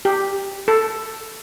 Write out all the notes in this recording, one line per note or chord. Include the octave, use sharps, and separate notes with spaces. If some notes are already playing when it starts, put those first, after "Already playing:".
G4
A4